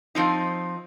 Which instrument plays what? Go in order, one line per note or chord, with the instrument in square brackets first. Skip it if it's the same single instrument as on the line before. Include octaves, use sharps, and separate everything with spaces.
[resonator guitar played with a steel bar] F3 C4 D#4